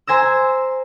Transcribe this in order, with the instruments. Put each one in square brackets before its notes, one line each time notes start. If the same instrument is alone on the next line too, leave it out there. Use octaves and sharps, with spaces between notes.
[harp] C5 G#5 A#5 E6